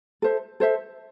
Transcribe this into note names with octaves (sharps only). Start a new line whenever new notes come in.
A4 C5 E5
A4 C5 E5